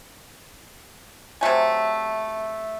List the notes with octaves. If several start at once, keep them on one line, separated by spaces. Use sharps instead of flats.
C3 F#3 A3 G#5